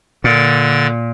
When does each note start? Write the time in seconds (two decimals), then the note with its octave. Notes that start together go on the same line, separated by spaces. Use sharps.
0.24 A#2 D3 A6